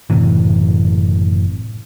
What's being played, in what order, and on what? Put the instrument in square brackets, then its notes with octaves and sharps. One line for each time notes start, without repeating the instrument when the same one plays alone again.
[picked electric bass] F#1 A2 C3 E3